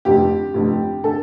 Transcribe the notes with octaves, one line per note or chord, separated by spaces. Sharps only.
F1 F2 D3 G4
F1 F2 D3
D3 A4